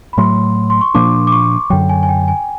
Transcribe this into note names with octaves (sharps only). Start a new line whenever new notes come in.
B5
A2 F#3 A3 C6
C6
C#6
A#2 F3 A#3 D4 D6
D6
C#6
F#2 D3 F#3 G5
G#5
G#5
G5
G#5